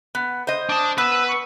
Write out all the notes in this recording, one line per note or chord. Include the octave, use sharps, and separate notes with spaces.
B3
C5 D#5
D4 A5 D#6
B3 B4 E6
C#6